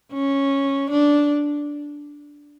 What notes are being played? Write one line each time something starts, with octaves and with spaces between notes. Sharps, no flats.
C#4
D4